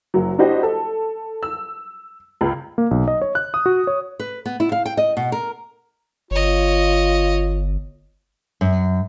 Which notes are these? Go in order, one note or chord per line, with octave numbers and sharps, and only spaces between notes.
F#1 F#3
D4 E4 F#4 G4 C5 D#5
A4
E6
C#2
A#3
B1
D#5
C#5
F#6
D#6
F#4
C#5
B4
B3
E4
F5
G5
D#5
B2
A#4
G1 F4 C#5 D#5
F#2